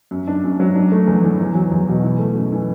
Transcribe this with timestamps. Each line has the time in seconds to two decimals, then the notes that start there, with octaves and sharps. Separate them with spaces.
0.11 F#2
0.28 D4
0.44 F#2
0.60 F#3
0.75 D4
0.92 A3
1.07 E2
1.24 E3
1.40 E2
1.55 F#3
1.71 E2
1.88 B2
2.04 E4
2.19 A3
2.35 F#2
2.52 E3